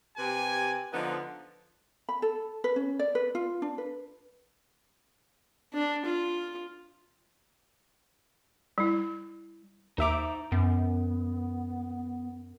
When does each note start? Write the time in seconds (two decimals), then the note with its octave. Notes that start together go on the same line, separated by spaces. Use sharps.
0.17 C3 G4 B4 G#5
0.93 D3 F3 B3 D#4
2.09 B5
2.22 A4
2.64 B4
2.76 C#4
2.99 D5
3.15 B4
3.35 F4
3.62 D4
3.78 B4
5.73 D4
6.05 F4
8.78 G3 E4
9.98 D#2 D#4 C5 E5 A#5 D6
10.52 F#2 B3